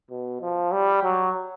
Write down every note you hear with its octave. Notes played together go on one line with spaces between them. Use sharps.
B2
F3
G3
F#3